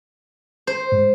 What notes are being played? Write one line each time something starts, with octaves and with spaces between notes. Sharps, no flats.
C5
G#2